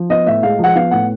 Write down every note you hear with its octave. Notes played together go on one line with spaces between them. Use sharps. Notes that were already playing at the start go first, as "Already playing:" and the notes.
Already playing: F3
B3 D#5
A2 E5
G#3 F5
F3 F#5
B3 F5
A2 F#5